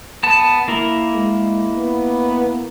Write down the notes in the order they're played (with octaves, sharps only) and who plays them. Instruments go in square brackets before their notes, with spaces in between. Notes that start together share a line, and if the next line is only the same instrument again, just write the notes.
[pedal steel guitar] B3 A5
A#3 E4 A#4
[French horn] G#3
B3